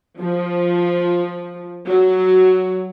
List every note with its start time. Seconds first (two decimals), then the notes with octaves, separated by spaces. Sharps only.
0.20 F3
1.87 F#3